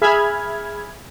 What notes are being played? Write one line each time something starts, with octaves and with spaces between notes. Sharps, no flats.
G#4 E5 B5 F6 G#6